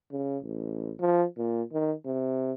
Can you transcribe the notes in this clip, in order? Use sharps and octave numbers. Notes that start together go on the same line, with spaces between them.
C#3
A1
F3
A#2
D#3
C3